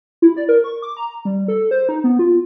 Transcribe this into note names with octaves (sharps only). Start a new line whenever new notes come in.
E4
D5
A#4
C#6
D6
A#5
G3
A4
C5
D#4
B3
F4